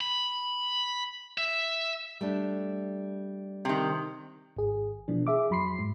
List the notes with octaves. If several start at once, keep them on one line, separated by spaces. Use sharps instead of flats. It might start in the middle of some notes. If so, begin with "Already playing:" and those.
B5
E5
G3 A3 D4
C3 D#3
G#1 G#4
B2 E3 F3 D4
G#4 E5 D6
F2 F#3 B5 C6 C7
G#2